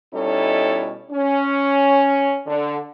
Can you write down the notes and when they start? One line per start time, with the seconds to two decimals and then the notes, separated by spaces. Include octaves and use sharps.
0.14 B2 G3 C#4 D#4 E4 A4
1.11 C#4
2.47 D3